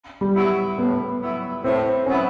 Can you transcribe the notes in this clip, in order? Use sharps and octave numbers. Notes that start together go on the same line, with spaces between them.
G3
F#3 B3 E4
A2 B3
F#3 B3 E4
A2 C4
F#3 B3 C#4 E4